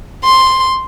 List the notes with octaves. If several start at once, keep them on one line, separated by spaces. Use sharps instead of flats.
C6